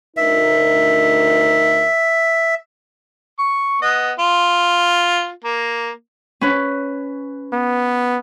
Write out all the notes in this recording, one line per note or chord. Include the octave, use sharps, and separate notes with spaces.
D2 D#4 A#4 E5
C#6
B3 D#5
F4
A#3
C#4 B4
B3